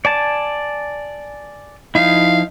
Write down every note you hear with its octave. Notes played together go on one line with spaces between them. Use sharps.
D5 G#5 A5
F3 D#4 E4 F5